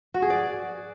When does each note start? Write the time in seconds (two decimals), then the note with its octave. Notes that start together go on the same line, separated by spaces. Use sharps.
0.14 F#4
0.22 G#4
0.30 D5